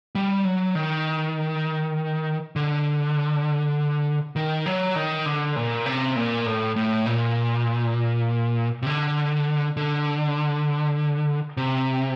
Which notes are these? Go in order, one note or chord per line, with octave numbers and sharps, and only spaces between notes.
G3
F#3
D#3
D3
D#3
F#3
D#3
D3
A#2
C3
A#2
A2
A2
A#2
C3
D3
D3
C3